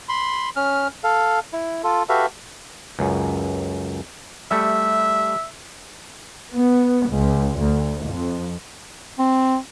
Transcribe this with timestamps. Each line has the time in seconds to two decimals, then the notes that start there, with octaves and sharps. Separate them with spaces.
0.09 B5 C6
0.56 C#4 F6
1.04 A4 F5
1.53 E4
1.84 F4 A4
2.09 F#4 G4 A4 B4 E5 F5
2.99 C#2 F#2
4.51 G3 A3 E5
6.53 B3
7.09 C#2
7.58 D2
8.07 F2
9.19 C4